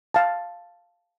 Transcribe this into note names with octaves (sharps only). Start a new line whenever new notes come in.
F5 A5